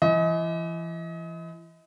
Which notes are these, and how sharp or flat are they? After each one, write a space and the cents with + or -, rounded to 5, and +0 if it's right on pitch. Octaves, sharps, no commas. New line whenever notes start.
E3 +35 D#5 +35